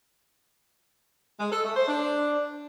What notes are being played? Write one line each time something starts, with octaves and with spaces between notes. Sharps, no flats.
G#3
A4
A3
C5
D4